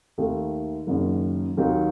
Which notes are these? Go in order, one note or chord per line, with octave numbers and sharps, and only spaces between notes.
D#2 D#3 A3 D#4
F#1 F#2 D#3
D#2 D#3 F#3 A#3 D#4